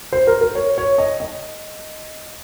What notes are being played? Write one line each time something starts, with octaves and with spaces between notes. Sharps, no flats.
C5
A#4
A#4
C#5
C#5
D#5
D#5